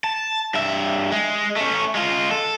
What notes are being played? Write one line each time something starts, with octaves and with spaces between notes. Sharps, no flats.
A5
G2 E5
G#3
A3 C#4
G#3 F4
A4